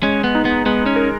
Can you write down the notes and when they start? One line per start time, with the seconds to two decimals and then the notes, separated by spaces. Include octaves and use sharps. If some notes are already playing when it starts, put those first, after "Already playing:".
0.03 G#3 C#4
0.24 B3
0.35 D#4
0.45 B3
0.66 G#3 B3
0.86 C#4
0.96 A#4